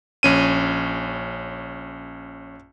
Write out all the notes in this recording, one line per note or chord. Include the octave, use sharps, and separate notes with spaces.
A#1 C#4 D#7